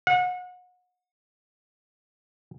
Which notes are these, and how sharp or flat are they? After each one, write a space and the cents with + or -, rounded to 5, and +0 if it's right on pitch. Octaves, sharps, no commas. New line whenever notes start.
F#5 -35